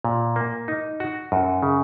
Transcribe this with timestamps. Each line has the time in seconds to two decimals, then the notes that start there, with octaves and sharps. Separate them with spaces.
0.04 A#2
0.36 A#3
0.68 D#4
1.00 F#4
1.32 F#2
1.63 C#3